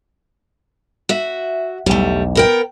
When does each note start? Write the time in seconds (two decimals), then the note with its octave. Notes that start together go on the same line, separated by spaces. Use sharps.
1.09 F#4 E5
1.86 B1 E2 G3 A3
2.35 B3 A#4 G5